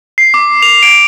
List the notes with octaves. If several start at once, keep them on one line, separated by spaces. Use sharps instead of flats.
C7
D6
F7
D7